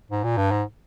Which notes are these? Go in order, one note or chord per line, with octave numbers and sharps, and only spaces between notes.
G#2
A#2
G2
G#2